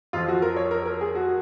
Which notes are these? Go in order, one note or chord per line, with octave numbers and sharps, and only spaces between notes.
F2 F3 F4
F#4
A#4
C#5
A#4
A#4
G#4
F#4